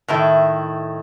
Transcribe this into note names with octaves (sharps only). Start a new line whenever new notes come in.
A2 D#3 E4